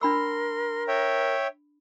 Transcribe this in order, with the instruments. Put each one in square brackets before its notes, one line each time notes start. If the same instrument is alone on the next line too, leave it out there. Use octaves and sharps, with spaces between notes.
[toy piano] D4 B5 E6 [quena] A#4 [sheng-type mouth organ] C6
[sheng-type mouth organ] C#5 E5 G5